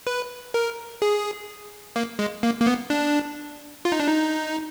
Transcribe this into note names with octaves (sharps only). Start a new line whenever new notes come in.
B4
A#4
G#4
A#3
G#3
A#3
A#3
B3
D4
F4
D#4
D4
D#4